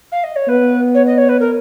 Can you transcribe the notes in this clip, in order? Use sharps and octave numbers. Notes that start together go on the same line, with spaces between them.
F5
D#5
C#5
B3 B4
C#5
D#5
C#5
B4
A#4